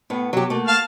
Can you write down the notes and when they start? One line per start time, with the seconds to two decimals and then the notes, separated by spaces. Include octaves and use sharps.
0.10 A2 B3
0.33 F#3 G4
0.50 A3 A#3 F#4
0.68 F5 A5 F6